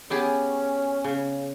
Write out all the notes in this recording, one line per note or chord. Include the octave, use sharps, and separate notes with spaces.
B3 C#4 G4 G#4
C#3